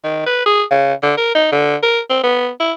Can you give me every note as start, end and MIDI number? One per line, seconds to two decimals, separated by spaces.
0.04 0.22 51
0.26 0.41 71
0.46 0.63 68
0.71 0.93 49
1.02 1.14 50
1.17 1.32 70
1.35 1.50 63
1.52 1.76 50
1.83 1.99 70
2.09 2.19 60
2.23 2.49 59
2.60 2.73 64